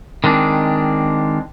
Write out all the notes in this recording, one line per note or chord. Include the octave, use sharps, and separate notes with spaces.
D#3 G#3 C4 D4